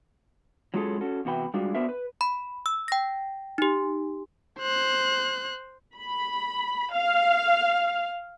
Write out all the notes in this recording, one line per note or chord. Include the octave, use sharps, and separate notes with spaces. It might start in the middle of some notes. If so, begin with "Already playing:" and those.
F#3 G#3 C#4 F4 G#4 A4
C#4 F#4 A4
E2 C3 F#4 B4 G5
G3 G#3 D4 F4 F#4
B3 D4 F#4 A#4 C5 E5
B4
B5
E6
G5 A#6
D#4 G4
C5 F#6
B5
F5